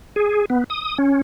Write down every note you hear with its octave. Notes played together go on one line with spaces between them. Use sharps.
G#4
B3
D#6
C#4